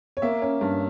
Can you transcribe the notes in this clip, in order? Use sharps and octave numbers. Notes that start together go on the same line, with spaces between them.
C#5
A#3 E5
C#4
G2